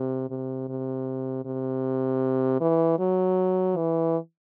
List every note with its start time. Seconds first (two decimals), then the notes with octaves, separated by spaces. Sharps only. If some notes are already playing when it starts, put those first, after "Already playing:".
Already playing: C3
0.30 C3
0.69 C3
1.45 C3
2.61 E3
2.99 F#3
3.77 E3